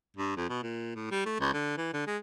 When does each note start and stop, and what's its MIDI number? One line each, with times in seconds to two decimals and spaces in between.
0.17 0.33 43
0.36 0.47 41
0.49 0.61 47
0.62 0.91 46
0.95 1.07 45
1.11 1.24 55
1.26 1.38 57
1.40 1.49 37
1.53 1.76 50
1.78 1.89 52
1.93 2.06 50
2.07 2.18 56